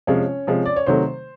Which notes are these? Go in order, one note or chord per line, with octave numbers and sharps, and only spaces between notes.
C3 F3 G#3 C#4 C#5
C3 F3 G#3
D5
C#5
C3 D#3 F#3 A3 C5